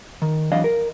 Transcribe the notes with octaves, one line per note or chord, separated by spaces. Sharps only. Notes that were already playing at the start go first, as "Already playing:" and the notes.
D#3
E3 F#3 D4 D#5 F5
A#4